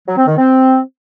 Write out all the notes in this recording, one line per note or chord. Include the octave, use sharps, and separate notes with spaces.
F#3
C4
D#3
C4